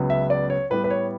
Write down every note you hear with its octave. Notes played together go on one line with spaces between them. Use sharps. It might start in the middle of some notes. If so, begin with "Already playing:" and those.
Already playing: C#2 C#3 F#3 B3
E5
D5
C#5
A2 G3 B3 B4
B4
C#5